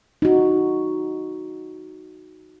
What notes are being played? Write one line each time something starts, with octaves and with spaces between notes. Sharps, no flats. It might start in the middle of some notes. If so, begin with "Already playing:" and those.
D#4 F#4